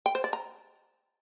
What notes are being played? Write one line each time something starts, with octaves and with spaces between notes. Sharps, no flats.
G5
C5
D5
A#5